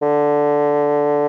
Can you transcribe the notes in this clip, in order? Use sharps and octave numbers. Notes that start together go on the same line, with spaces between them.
D3